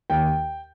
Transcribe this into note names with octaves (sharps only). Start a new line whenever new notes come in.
D#2 G5